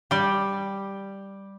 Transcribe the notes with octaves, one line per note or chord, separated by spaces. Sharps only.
G3 G4